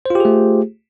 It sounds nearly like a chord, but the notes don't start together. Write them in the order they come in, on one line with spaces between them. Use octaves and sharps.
C5 F4 G4 G#4 A3